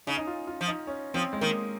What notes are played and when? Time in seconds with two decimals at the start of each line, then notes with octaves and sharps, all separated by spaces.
0.07 C#3 D#4
0.17 D#4
0.27 F4
0.47 F4
0.61 F3
0.67 D#4
0.87 C#4
1.14 F3 C4
1.33 G#3
1.41 D#3 A#3